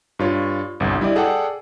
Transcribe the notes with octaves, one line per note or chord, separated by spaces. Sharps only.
G2 F4 C#5
G1 C2
G3 E4 G4 D5 D#5
G#4 A4 D5 F#5 G5